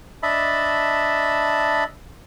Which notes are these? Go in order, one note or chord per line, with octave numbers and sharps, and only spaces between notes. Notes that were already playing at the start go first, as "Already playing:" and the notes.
D4 D#5 E5 A5 B5